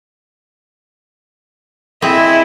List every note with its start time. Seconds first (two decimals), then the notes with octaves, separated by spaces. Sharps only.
2.02 C4 E4 G#4 D#5